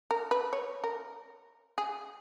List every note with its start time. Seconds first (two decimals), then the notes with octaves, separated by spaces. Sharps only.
0.11 A#4
0.31 B4
0.53 C#5
0.84 A#4
1.78 G#4